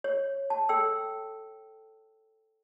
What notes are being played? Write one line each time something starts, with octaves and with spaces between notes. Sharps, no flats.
C#5
A5
A4 G5 E6